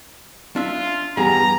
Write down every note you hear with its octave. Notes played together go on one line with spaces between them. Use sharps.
D4 F4 E5
E2 G2 G#4 A#5